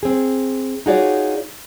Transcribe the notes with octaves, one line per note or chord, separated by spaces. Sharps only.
C4 G#4
D#4 F4 F#4 G#4 C#5 D5